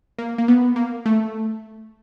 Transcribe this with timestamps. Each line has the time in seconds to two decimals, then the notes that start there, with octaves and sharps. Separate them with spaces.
0.19 A#3
0.38 A#3
0.48 B3
0.76 A#3
1.06 A3